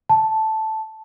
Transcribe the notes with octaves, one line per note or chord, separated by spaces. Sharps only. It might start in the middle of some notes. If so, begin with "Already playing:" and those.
A5